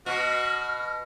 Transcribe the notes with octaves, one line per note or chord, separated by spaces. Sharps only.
B2 F#4 F6